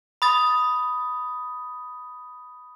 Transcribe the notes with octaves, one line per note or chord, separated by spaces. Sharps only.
B5 D#6 A6